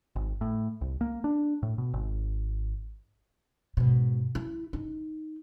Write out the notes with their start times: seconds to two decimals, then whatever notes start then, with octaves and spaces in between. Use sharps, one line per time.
0.16 G#1
0.41 A2
0.81 C2
1.01 A#3
1.24 D4
1.63 A2
1.78 B2
1.94 G#1
3.77 G#2 B2
4.35 E4
4.73 D#4